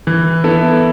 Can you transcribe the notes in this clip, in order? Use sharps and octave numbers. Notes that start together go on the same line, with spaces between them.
E3
B3 E4 A4